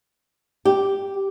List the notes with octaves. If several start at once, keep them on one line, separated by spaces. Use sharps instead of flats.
G4